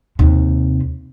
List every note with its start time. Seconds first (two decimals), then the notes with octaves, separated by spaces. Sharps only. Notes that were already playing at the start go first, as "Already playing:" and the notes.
0.19 D#2 C3